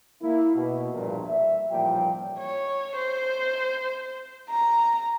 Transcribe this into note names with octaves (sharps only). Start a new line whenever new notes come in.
A#3 E4
B2
A#1 E2 G2 A#2
E5
A1 D#2 A#2 F3 G3 G5
C#5
C5
A#5